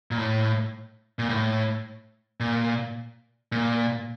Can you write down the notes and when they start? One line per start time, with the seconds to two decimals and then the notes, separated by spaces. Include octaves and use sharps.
0.11 A#2
0.18 A2
1.19 A#2
1.29 A2
2.40 A#2
3.52 A#2